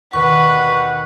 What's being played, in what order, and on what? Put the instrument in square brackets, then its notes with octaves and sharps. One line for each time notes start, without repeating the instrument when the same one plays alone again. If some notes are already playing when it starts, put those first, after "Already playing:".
[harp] D#2 B2 D#3 [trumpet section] G3 F#5 [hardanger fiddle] B4 [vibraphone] C#6